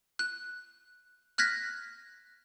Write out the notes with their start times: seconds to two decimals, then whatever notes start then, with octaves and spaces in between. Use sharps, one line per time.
0.19 F#6
1.38 F6 F#6 G#6 A#6 B6